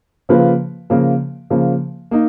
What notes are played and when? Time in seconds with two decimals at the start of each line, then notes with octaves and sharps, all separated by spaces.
0.29 C#3 F3 A#3 F4 B4
0.90 C#3 F3 A#3
1.50 C#3 F3 A#3
2.11 A#3 D#4